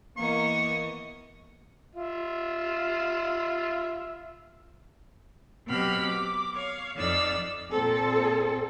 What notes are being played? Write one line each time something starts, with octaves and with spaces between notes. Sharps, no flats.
E3 A#3 B3 D#5 C#6
F4 E5
B2 F#3 C4 G4 B5 F6
D6
C#5 F5
F2 D#4 D5 F5 E6
A#2 C4 A4